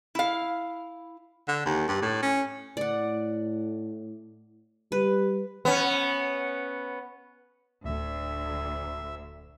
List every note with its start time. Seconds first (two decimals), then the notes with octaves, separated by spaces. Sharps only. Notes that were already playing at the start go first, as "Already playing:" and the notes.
0.15 E4 F5
1.48 D3
1.65 D#2
1.88 G2
2.02 A2
2.22 C#4
2.77 A2 D5 F#5
4.92 G3 B4
5.65 B3 C#4
7.85 D1 D2 E5